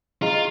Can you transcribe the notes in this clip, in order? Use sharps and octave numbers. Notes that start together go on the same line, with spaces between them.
F4 G#4 D#5 A#5